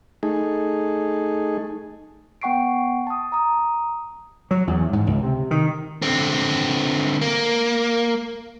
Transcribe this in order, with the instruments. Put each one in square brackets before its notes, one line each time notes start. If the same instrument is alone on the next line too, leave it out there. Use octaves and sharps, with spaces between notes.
[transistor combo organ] A3 D#4 G#4
[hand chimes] B3 F#5 G5 C#6 C7 D7
A5 D#6
A#5 D#6
[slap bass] F#3
E2
G#2
C#2
C3
D#3
[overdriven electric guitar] D3 C4
A#3